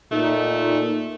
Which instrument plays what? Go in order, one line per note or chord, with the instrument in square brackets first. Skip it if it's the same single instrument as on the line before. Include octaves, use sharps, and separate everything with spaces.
[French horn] A#2 [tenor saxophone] A3 [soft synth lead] D#4